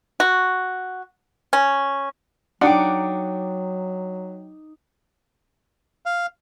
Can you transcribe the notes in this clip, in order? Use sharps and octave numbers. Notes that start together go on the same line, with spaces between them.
F#4
C#4
F#3 D4 D#4 F#5 G5 D6 C#7
F5